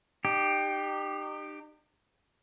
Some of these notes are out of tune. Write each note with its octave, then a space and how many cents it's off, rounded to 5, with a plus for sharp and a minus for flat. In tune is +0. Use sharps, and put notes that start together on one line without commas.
D#4 -40 G4 +0